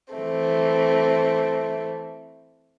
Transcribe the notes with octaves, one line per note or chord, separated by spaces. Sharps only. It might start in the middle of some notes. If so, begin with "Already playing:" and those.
E3 A3 C4